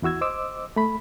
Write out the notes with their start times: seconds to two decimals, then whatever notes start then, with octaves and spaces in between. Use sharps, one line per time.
0.02 E2 E4 F#4 E6 G#6
0.21 C5 D#5 D6 E6
0.76 A3 B5